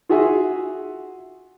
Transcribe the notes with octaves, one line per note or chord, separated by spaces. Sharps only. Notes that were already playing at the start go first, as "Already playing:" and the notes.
F4 F#4 G#4 E5 G#5